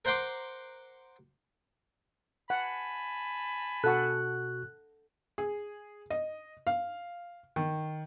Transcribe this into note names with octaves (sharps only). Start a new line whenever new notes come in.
A#4 C5 F#5 G5 C6 D6
F#5 G#5 A5 B5
B2 F#4 A4 F#5 C#6 F#6
G#4
D#5
F5
D#3